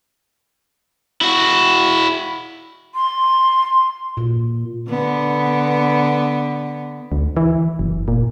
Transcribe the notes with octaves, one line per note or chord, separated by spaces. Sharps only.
E4 F#4
C6
A#2
D3 B3
D2
E3
F#1
A#2